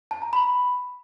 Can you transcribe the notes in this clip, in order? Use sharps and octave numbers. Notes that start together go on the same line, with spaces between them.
A5
A#5
B5